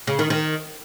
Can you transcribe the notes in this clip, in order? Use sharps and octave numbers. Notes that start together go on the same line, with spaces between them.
C#3
D#3
D#3